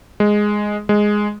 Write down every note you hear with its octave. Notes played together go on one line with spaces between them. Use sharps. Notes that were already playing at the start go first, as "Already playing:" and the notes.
G#3
G#3